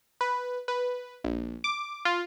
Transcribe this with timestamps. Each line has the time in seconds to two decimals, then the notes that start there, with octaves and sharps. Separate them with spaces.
0.21 B4
0.68 B4
1.24 A#1
1.64 D6
2.05 F4